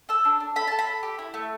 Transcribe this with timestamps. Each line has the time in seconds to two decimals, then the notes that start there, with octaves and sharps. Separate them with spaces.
0.09 A4 E6
0.25 D4
0.40 D4
0.56 A4 B5
0.67 A4 A5
0.79 B5
0.87 A4
1.03 G4
1.19 E4
1.34 A3